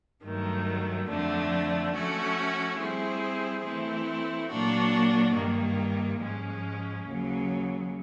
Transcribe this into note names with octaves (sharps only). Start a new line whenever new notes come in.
G2 D#3 F#3 A3
F2 D3 F3 A3 D4
F3 A3 C#4 F#4 A4
G3 C4 E4 G#4
E3 A3 C4 E4
A#2 F#3 A#3 D4 F#4
G2 D#3 G3 A#3
G#2 F3 G#3 C#4
D#2 C#3 F#3